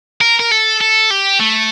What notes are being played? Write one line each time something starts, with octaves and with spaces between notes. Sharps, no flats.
A#4
A#4
A4
A4
G4
A3